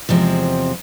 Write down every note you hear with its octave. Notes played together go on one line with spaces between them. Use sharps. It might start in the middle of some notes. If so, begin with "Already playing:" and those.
E2 C3 F3 G#3 C4